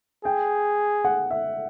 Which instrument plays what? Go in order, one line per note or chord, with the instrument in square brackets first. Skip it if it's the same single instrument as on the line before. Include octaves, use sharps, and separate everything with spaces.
[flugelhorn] G#4 [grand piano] G5
[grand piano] F#5
E5